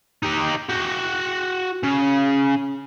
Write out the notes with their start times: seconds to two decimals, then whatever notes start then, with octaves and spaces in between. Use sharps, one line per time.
0.23 D#4 G4
0.69 F#4 G5
1.83 C#3